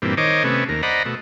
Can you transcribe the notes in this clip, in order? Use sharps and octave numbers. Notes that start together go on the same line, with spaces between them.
G2 A#2 E3 C4
D#3 C5 C#5 D#5 D6
C3 A3 B3 C#4
D#2 A#4
C5 D5 D#5 F#5 A#5 B5
B2 A3